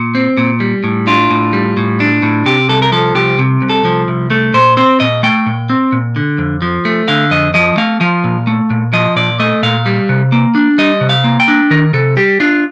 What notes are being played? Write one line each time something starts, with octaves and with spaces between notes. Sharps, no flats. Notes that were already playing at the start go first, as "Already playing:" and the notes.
Already playing: A#2
C4
A#2
G3
A2
D4 F4
A2
G3
A2
D4
A2
C3 G4
C2 A4
A#4
F3 A4
C2 G4
C3
C2
A4
F3
C2
A3 A4
A#2 C5
C4 C5
A#2 D#5
A3 G5
A#2
C4
A#2
D3
F2
F3
A3
D3 F5
F2 D#5
F3 D#5
A3 F5
F3 F5
A#2
A3
A#2
F3 D#5
A#2 D5
A3 D#5
A#2 F5
G3
C3
A#3
D4
G3 D#5
C3
F5
A#3
G5
D4
D#3 A#4
C3 A4
G3 G4
D4 F4